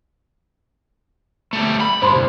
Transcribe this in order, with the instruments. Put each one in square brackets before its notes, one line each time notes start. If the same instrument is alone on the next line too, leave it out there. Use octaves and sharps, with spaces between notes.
[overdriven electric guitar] G3 A3
B5
[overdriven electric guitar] G2 D3 [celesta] C5 B5 C6
[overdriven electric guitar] C2